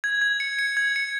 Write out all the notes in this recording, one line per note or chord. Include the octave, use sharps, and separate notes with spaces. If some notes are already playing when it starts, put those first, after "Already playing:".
G#6
G#6
C#7
C#7
G#6
C#7